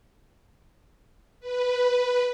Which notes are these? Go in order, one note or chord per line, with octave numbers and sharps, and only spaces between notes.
B4